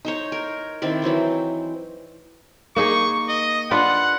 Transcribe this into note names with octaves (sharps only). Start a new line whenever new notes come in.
D#4 C5 C#5
A#4
D#3 C4 E4 D5
E3 F#3 C4 D#4
A#3 D#4 G#4 C#6
D#5
D4 F4 B4 F#5